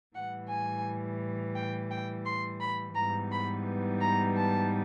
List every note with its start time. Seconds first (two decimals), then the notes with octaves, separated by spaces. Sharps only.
0.15 A2 E3 G3 F#5
0.50 G#5
1.56 G5
1.91 G5
2.25 C6
2.60 B5
2.95 G#2 E3 G3 B3 D#4 A#5
3.31 B5
4.01 A#5
4.37 A5